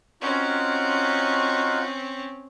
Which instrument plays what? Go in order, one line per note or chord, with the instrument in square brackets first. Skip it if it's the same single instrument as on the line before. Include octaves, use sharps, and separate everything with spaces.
[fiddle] C4 C#4 [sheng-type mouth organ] D#4 F4 F#4